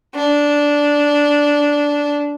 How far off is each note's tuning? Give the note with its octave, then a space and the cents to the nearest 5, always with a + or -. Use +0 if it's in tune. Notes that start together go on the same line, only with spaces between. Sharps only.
D4 -10